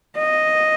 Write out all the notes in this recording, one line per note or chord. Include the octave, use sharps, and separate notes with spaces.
D#5